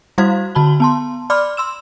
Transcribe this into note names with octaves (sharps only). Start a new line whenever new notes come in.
G3 E4 F#4 C5 F5 G#6
D3 F#4 A5 B5 F#7 G7
B3 A5 C6
D5 B5 C6 D6 F6
C6 E6 E7